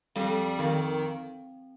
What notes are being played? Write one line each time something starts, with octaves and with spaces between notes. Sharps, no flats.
F2 G3
F2 D#3